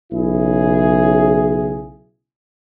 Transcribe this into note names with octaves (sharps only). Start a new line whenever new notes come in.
B1 C#3 E4 G#4